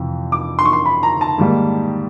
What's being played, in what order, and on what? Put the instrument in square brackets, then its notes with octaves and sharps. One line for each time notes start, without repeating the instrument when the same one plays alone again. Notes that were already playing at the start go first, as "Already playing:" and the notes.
Already playing: [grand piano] F2 C3 E3
D6
C6
C#6
C6
B5
A#5
A5
G#2 D#3 G3 A#3